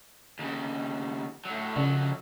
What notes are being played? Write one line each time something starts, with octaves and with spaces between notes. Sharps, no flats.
D#2 C#3
A2 F#3
F2 C#3 F#3